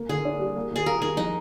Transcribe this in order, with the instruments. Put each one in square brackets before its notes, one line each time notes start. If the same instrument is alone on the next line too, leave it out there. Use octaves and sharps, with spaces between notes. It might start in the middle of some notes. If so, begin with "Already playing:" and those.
Already playing: [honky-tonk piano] A#3
[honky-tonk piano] D3 [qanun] G#4
[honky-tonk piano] D4
G3
A#3
[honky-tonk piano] D#2 [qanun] G#4
[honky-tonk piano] F4 [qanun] A#4
[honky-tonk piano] D#3 [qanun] G#4
[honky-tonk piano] F3 [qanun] D#4